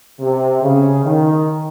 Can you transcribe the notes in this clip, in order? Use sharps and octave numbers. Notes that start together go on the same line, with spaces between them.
C3
C#3
D#3